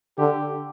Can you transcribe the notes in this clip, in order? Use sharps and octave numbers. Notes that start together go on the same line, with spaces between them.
D3 G4